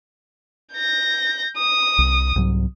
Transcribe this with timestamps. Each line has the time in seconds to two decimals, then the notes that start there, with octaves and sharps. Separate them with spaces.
0.74 G6 A#6
1.58 D#6
1.99 C2
2.36 C2 G#2 F#3